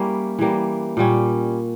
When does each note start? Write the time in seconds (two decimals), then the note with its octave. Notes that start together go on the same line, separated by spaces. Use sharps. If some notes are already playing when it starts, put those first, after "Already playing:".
Already playing: G3 A#3 C#4 E4
0.39 E3 G3 A#3
0.97 A#2 G3 C#4